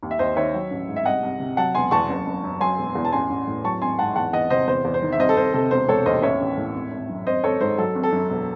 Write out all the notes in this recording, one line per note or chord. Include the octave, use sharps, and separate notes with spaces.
D#2
E5
D#2 C5 D#5
D#3 C#5 E5
F#3
A1
G#2
E5
C2 D#5 F#5
C2
C3
F#3 F#5 A5
E1 G#5 C6
E2 A5 C#6
F#1
F#1
F#2
F#3 G#5 C6
E1
E2
A5
A1 G#5 C6
A1
A2
F#3 A5 C#6
G#1 G#5 C6
G#2 F#5 A5
E2 F#5 A5
E2 D#5 F#5
C3 C5 D#5
E2 C5
E2
C5
D#3
E5
C2 C5 D#5
A4
C2 C5
C3 A4
E1 C5
E1 A4 C#5
D#2 C5 D#5
A1 C#5 E5
A1
A2
G#1
G#1
F#2
G#1 C5 D#5
G#1 A4 C#5
G#2 C5
F#3 A4
G#1
A4
F#2
E1